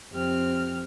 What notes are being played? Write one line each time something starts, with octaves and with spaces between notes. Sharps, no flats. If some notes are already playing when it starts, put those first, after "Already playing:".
F2 C3 C4 F6